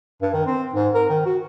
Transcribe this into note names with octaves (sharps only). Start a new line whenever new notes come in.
G2
D#3
C4
G#2
A#4
D#3
F#4